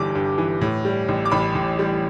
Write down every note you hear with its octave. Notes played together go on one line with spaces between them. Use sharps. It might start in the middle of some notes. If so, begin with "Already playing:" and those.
Already playing: G1 G2 E3 G3 D6
G2
E3
A2
G3
A1
D6
A1 B5
A2
G3